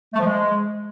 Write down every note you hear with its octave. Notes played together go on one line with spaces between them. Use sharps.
A3
F3
G#3